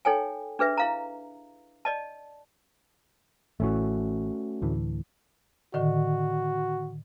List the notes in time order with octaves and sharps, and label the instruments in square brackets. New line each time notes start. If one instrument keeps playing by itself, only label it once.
[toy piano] D#4 A4 C#5 G5 G#5
D4 G#4 B4 E5
E4 F5 A#5
D5 D#5 A5
[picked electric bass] A1 E3 [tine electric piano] A3 C#4 F#4
[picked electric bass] D2 A2 E3
[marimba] A2 D3 D#3 [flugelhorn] F#4